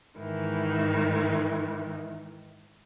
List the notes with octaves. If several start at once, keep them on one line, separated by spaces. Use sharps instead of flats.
G#2 D#3 E3